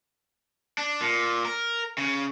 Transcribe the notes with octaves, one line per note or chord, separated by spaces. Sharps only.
D4
A#2
A#4
C#3